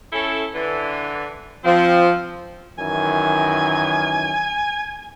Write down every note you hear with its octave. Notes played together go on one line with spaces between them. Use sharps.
C#4 E4 A4
D3 E3
F3 C4
F#2 D#3 E3 G#5